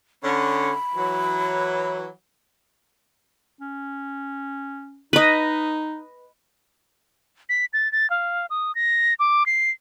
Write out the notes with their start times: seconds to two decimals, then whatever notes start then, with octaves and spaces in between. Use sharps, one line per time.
0.24 D3 C#4 B5
0.95 E3 F#3
3.59 C#4
5.13 D#4 B4 D#5
7.49 B6
7.73 A6
7.92 A6
8.10 F5
8.50 D#6
8.75 A#6
9.19 D6
9.46 C7